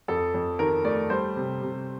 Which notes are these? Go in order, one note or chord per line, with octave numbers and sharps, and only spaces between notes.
F2 A4
F2
D#3 A#4
A3 D5
G3 C5
C3
C3